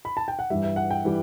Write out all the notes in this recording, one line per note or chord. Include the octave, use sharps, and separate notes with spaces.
B5
A5
G5
F#5
G2 E3 G3 E5
E5
F#5
G5
E3 G3